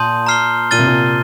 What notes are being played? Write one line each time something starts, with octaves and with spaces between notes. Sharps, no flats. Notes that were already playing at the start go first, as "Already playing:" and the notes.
Already playing: A#2 A5 C6 D#6 G6
A#5 F6 C7 G7
A#2 F6 A6 D#7 G7
C3
A#2